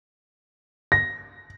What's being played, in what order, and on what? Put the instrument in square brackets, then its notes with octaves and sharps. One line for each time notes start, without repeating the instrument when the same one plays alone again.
[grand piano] A#6